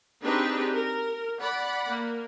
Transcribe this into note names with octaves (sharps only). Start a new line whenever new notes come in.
C4 D4 D#4 G4 G#4 B4
A#4
D5 F#5 B5
A#3